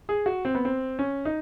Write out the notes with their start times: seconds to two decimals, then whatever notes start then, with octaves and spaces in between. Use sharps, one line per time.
0.09 G#4
0.26 F#4
0.45 C4
0.55 B3
0.65 C4
0.99 C#4
1.25 D#4